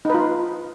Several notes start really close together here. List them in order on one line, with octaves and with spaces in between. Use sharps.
D#4 B4 F4